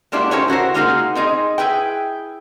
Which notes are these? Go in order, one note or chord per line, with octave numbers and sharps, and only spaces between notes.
G3 G#3 A#3 D4 E4 F#4
C#4 D#4 G4 A4 C5 C#5
E4 F#4 A#4 C5
G#3 A#3 D#4 F4 F#4 G#4
C4 D#4 G#4 D#5
E4 G#4 B4 G5